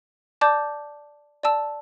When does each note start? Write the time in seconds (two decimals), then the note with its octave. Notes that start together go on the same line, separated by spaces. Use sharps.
0.41 D5 A5 D6 G6
1.43 D5 A5 E6